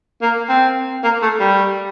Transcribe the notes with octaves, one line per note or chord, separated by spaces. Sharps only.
A#3
C4
A#3
A3
G3